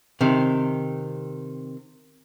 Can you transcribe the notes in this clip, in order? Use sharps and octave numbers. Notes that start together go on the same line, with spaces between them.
C3 D#3